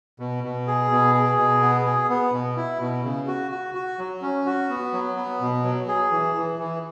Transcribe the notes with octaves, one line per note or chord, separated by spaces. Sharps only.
B2
B2
G#4
B2
G#4
B2
B3
G#4
B3
B2
E4
B2
C#3
F#4
F#4
F#4
F#3
C#4
F#4
B3
F#3
B3
B2
F#3
G#4
E3
E3
E3